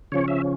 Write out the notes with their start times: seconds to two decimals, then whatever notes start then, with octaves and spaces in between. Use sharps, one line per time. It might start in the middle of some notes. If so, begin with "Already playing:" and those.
0.12 C#3 F3 C#4 C#5
0.28 E5